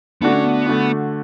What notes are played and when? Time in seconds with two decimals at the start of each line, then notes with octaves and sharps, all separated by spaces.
0.22 D3 A3 B3 D4 F#4
0.33 C#4
0.44 B3
0.66 D3 A3 D4 F#4